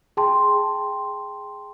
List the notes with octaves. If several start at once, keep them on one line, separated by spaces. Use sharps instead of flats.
G#4 G5 A5 C6